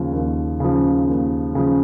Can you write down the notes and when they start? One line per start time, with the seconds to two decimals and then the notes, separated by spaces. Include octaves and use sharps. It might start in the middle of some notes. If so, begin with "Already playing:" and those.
Already playing: D#2 C#3 F3
0.13 D#2
0.60 C#3 F3
1.08 D#2
1.55 C#3 F3